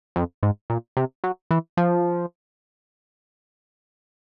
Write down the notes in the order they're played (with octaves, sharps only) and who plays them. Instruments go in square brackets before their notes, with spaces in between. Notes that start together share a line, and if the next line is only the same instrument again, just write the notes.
[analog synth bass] F2
G#2
A#2
C3
F#3
E3
F3